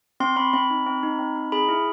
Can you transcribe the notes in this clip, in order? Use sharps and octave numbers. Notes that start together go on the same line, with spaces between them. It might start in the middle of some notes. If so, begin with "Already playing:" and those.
C4 C6
C4 B5
C4 B5
D#4
C4
D#4
C4
D#4
G#4 B5
E4